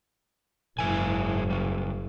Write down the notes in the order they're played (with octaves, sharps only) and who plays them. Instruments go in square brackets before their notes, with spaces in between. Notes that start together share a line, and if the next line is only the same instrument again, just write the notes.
[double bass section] F#1 [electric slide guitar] G#2 E4 G#5
[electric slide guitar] C#3 G3